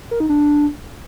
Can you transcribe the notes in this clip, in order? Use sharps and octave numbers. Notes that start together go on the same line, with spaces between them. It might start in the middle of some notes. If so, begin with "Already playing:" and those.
A#4
D#4
D4